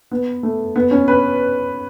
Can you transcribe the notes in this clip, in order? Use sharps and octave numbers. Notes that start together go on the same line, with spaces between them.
B3
A3
B3
C#4
B4